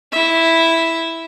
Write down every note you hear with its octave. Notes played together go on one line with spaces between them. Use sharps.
E4 E5